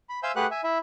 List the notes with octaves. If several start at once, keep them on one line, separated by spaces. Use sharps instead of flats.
B5
C5 E5 F5 G#5 E6 G6
A3 G4 G#4 B4 F#5 F#6
E5 G#5
E4 E5